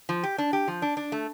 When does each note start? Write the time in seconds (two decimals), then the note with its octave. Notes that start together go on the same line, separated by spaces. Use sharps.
0.09 F3
0.23 G4
0.38 D4
0.53 G4
0.68 F3
0.82 D4
0.97 D4
1.12 A3